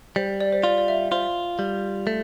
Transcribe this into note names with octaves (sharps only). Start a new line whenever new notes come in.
G3 C5
D5
C5
F4 D5
D5
E5
F4 C5
G3
A3